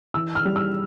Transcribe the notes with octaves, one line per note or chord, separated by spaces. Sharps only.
E3 E6
F6
G3
E6